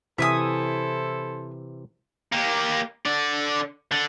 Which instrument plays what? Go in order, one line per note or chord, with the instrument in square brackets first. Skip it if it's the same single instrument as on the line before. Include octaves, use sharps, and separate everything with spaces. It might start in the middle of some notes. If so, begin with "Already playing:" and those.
[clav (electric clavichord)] C3 E3 [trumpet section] E4 A4 C5 [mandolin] E5 G#5 D#6
[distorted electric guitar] A#3 G4
D3 D5
D3